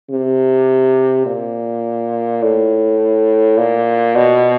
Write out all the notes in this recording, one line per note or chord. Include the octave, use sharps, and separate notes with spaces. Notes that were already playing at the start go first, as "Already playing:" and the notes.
C3
A#2
A2
A#2
B2